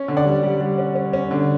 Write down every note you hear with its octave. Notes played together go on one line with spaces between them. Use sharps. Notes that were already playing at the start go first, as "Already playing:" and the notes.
Already playing: C#4
D3
D5 F#5
G3
G3
G3
C#4
C#4
C#4
D3